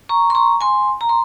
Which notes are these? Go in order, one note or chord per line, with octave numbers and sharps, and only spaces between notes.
A#5 C#6
C6
A#5 C#6
G#5 C6
A#5
C6